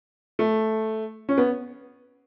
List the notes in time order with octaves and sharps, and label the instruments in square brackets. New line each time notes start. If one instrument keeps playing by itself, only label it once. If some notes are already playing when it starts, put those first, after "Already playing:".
[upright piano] A3
C#4
B3